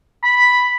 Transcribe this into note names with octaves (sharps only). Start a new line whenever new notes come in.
B5